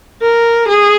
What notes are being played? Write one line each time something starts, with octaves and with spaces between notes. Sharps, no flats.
A#4
G#4